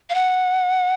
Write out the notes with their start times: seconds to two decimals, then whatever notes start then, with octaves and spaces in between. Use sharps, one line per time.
0.10 F5
0.15 F#5